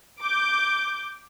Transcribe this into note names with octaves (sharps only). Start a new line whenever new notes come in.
D6 G6